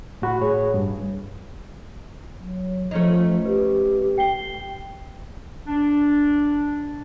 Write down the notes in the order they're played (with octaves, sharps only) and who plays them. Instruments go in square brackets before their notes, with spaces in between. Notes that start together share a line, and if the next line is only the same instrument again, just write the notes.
[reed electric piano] A2 F#4 B5
A2 G#4 C#5
G2
[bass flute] F#3
[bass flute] F3 [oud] A3 C#4 D#4
[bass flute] G4 [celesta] B4
[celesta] G5 C7 G7
[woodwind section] D4